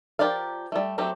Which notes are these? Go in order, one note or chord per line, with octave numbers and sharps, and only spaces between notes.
F3 G4 A#4 D5 F5
G3 A3
F#3 A3 C4 G4